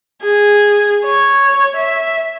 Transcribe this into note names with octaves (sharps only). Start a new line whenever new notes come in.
G#4
C#5
E5